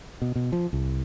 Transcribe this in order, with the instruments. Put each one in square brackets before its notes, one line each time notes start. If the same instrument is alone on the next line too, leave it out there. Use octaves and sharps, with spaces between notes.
[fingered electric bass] B2
B2
F3
C2